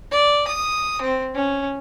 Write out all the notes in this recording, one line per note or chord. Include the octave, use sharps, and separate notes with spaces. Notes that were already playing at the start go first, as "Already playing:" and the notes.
D5
D#6
C4
C#4